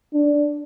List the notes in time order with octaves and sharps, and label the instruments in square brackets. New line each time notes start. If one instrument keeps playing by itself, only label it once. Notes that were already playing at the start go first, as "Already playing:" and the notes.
[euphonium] D4